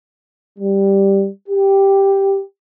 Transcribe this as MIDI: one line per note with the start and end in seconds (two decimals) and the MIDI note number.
0.59 1.28 55
1.48 2.39 67